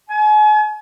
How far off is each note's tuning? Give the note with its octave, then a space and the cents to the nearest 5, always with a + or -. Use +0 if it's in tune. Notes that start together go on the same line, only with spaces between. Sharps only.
G#5 +40